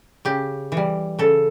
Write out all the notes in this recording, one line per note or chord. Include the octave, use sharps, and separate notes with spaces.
C#3 G4
E3
G3
C#3 A4